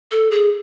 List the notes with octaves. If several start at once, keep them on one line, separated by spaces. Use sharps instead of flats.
A4
G#4